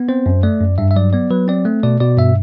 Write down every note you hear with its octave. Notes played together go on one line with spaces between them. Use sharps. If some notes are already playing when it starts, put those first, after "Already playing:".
Already playing: B3
C4 C5
F#2
A3 D5
F#2
G2 E5
E5
F#3 D5
B3 D5
F#3 B4
C4 D5
A3
B2 D5
B2 D5
G2 E5